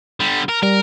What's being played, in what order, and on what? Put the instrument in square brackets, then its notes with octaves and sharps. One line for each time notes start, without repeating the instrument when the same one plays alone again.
[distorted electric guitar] D3 G3
A#4
[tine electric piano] G3 [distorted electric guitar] A#4